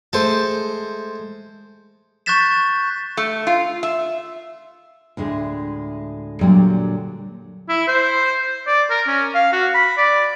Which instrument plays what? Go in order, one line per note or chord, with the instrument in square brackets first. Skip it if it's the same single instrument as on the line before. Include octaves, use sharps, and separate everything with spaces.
[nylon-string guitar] G#3 A3 [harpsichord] A4 C5
[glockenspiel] C#6 F#6 G6 A6 B6 E7
[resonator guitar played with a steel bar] A3
F4
E5
[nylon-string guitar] D2 A2 G#3
A#2 D3 F#3 G3
[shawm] E4
C5
D5
A#4
C#4
F5
F#4
B5
D5